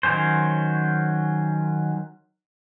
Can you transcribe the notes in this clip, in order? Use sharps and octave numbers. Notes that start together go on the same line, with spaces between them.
D#3 F#3 C#4 C5